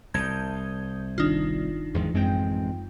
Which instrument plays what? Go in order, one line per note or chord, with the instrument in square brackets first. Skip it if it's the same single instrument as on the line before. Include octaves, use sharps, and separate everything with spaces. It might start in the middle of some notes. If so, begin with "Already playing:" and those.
[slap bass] C2 [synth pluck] A5 D#6 G6 [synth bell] G#6
[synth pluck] G1 D#3 D4 [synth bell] D#4 F4
[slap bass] E2 G#2 D#3 [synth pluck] F3
[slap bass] A1 G#3 C4 [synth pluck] F#2 G5